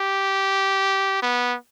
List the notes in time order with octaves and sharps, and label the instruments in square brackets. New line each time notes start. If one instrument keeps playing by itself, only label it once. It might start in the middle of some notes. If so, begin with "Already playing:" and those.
Already playing: [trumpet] G4
B3